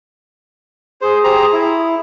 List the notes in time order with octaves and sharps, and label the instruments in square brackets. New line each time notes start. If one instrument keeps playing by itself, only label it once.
[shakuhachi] G#4 [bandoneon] C5
[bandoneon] G4 C5 A#5
E4